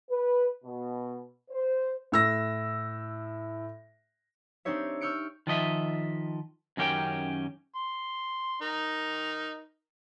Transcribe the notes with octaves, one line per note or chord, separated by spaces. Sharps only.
B4
B2
C5
A2 E6 A#6
C4 D4 D#4 G4 C#5 E5
C#6 E6 F6 G6 C#7 D7
D#3 F3 D#5 E5
F#2 D#3 C#4 G4 A#4 G5
C6
D#4 A#4